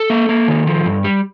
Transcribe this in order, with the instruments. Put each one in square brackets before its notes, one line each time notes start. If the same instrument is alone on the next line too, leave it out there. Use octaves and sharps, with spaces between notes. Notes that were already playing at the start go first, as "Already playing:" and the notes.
Already playing: [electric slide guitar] A4
A#3
A#3
D#3
F3
G2
G3